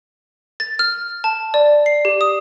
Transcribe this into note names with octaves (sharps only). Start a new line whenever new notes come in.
A6
F6
A5
D5
C7
G4
D#6